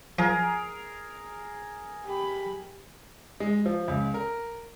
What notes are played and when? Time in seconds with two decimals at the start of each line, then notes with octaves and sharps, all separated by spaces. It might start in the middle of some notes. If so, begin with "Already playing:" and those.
0.19 F3 G#4 A#4
2.05 G4 B5
3.40 G#3
3.66 F3
3.88 C#2
4.14 A#4